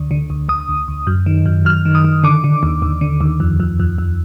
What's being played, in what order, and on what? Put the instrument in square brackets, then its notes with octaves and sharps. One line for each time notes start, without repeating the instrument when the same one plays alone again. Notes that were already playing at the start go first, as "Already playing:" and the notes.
Already playing: [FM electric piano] D2 D3
D3
D2
D2 D#6
D2
D2
F#2
D#3
F#2
F#2 F6
D#3
D#6
D#3
D3 D6
D3
D#2
D#2
D3
D#2
F2
F2
F2
F2